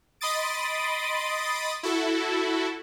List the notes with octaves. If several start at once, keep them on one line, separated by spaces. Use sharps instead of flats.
D#5 B5 C6 D#6 A6 D7
E4 F#4 A4